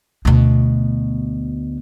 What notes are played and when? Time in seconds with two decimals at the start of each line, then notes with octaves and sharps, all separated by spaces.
0.25 D2 B2